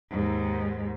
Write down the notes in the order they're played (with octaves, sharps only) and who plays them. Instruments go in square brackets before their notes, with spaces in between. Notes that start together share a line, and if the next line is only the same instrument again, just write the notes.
[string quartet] D#2 G#2